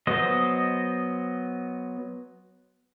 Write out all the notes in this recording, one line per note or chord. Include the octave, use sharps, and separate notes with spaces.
F#3 B3 C5 D#5